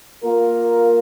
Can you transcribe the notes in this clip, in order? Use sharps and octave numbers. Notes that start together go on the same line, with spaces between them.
A#3 F4 A#4